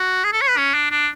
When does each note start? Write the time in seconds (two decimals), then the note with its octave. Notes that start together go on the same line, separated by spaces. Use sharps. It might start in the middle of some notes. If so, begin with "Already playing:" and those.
Already playing: F#4
0.24 G#4
0.33 A4
0.41 C#5
0.49 B4
0.57 C#4
0.74 D4
0.91 D4